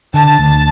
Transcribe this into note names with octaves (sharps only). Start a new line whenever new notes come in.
D3 A5
D2